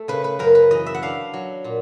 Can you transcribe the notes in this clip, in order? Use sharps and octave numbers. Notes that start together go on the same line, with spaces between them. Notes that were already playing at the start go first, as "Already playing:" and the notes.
Already playing: A3
C#3 B4
B4
F#2 A#4
B4
E3 D#5
E5
F#5
D4 F5
F#3
A#2